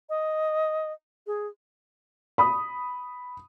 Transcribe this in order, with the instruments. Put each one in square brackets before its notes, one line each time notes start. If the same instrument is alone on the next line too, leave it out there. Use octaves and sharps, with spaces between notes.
[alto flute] D#5
G#4
[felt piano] B5 D#6